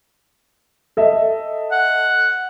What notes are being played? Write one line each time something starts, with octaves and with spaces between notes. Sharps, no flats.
A4 D#5 E5
F#5